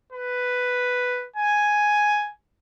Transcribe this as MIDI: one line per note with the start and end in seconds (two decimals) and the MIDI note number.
0.12 1.28 71
1.36 2.32 80